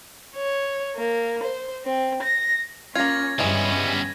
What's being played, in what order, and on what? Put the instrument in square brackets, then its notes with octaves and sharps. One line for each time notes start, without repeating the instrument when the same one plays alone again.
[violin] C#5
A#3
C5
C4
A#6
[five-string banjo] A#3 F4 [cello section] C#4 [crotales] G#6 A#6
[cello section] G2 C#4 [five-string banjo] E3 G#3 [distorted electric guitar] G3 B3